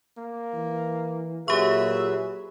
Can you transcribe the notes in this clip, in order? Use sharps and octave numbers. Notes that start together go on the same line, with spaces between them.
A#3
E3
A#2 F#3 G4 G#4 B4 E5 C#6